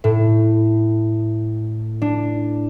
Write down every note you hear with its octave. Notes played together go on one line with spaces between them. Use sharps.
A2
D4